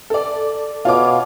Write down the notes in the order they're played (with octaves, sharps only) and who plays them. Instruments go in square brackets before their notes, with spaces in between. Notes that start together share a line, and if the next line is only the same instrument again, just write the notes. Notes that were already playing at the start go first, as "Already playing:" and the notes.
[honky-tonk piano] A4 D5
[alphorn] B2 [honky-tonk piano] F4 C#5 D6